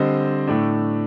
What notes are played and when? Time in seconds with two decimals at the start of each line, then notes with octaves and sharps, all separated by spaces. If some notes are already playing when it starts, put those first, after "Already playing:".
Already playing: D3 G3 C4 C5 D#5
0.48 A2 A3 D4